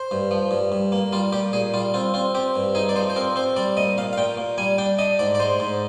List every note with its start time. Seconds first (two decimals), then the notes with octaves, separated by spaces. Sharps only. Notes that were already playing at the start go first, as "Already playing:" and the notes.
Already playing: C5
0.11 G2
0.31 F3
0.51 G2
0.72 G2
0.92 A#3
1.13 G3 F4
1.32 A#2 G4
1.53 A#2 G#4
1.74 G3 F4
1.94 C4 F4
2.14 C4 F4
2.35 C4 G4
2.56 G2
2.75 D#4 G#4
2.89 D5
2.96 F3 C5
3.10 C5
3.16 C4 A#4
3.36 C4 C5
3.56 G3 D5
3.77 A#2 D#5
3.98 A#2 F5
4.13 F5
4.18 A#2 G5
4.37 A#2
4.58 G3 G#5
4.78 D4 G5
4.99 D4 D#5
5.19 G#2 D5
5.35 D5
5.40 G#3 C5
5.60 G#2